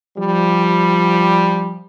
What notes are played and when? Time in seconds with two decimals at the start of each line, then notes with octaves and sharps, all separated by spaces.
0.18 F3 G3